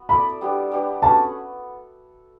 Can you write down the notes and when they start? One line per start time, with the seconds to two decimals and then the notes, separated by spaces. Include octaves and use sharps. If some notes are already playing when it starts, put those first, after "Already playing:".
Already playing: B3 F#4
0.09 E4 A4 D5 B5
0.41 G3 B3 D4 G4
0.71 G3 B3 D4 G4
1.02 A3 C#4 F#4 B4 A5